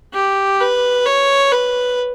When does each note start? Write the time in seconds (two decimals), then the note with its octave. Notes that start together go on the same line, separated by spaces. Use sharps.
0.14 G4
0.61 B4
1.06 C#5
1.51 B4